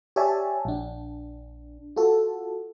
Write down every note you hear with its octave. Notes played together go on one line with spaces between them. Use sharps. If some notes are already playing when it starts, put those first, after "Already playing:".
G4 C#5 D5 E5 G#5 A5
A#1 D4
F4 F#4 A4